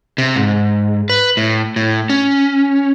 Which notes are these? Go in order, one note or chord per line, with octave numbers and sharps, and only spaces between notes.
C3
G#2
B4
A2
A2
C#4